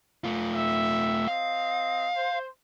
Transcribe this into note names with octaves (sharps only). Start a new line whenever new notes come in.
A3 F4
B3 E5
C4 D#5 F5
C5